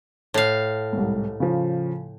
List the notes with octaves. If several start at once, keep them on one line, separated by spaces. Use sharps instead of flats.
A2 F5
C2 G#2
C#3 F3